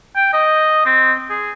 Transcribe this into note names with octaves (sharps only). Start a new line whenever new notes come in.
G5
D#5
C4
G#4